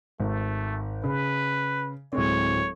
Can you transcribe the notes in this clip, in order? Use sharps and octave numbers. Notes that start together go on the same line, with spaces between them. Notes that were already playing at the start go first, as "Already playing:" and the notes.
G#1 A3
C#3 B4
D1 G#3 C4 C#5